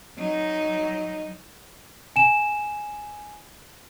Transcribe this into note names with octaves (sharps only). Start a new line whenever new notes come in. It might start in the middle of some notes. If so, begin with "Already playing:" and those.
F#3 D#4
G#5 E7